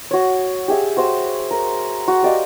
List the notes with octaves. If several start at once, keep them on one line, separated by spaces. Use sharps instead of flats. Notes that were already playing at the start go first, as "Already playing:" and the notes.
F#4 C#5
G4 G#4 E5
F#4 C5 E5
A#4
F#4
G4 D5 D#5 F5